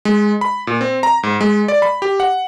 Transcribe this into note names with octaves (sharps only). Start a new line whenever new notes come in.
G#3
B5
A#2
C4
A#5
G#2
G#3
D5
B5
G4
F#5